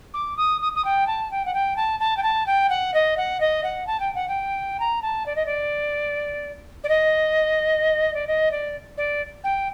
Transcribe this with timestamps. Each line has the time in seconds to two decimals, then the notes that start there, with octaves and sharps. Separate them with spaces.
0.14 D6
0.37 D#6
0.61 D#6
0.75 D#6
0.85 G5
1.07 A5
1.31 G5
1.46 F#5
1.54 G5
1.77 A5
2.00 A5
2.17 G5
2.23 A5
2.47 G5
2.70 F#5
2.94 D#5
3.17 F#5
3.40 D#5
3.64 F#5
3.87 A5
4.00 G5
4.15 F#5
4.28 G5
4.80 A#5
5.02 A5
5.26 D5
5.36 D#5
5.46 D5
6.84 D5
6.89 D#5
8.14 D5
8.27 D#5
8.52 D5
8.97 D5
9.44 G5